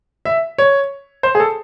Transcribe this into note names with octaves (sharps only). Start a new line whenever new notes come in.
E5
C#5
C5
G#4
A4